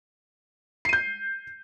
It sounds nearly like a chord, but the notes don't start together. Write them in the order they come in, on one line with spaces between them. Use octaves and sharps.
C7 D#7 G6